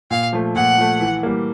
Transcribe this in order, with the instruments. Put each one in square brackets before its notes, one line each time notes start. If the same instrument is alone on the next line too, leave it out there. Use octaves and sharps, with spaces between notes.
[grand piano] A#2 [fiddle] F5
[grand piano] F3 A3
[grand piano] A#2 [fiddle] F#5
[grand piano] F3 A3
E3
G3 A#3